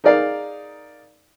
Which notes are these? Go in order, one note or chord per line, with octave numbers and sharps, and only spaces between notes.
D#4 G#4 A#4 D5 F5